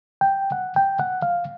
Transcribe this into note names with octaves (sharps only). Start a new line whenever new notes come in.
G5
F#5
G5
F#5
F5